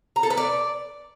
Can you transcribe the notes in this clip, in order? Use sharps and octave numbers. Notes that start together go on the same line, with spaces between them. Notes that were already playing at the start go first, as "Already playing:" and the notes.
A#5
A4
B4
D5